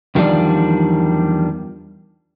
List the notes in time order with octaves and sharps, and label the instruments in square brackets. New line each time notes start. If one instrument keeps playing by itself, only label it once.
[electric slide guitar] E2 D#3 F3 G3 D4 D5